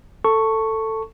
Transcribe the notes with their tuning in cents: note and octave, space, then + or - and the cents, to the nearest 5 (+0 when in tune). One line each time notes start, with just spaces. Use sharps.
A4 +10 A5 +15 C#6 +0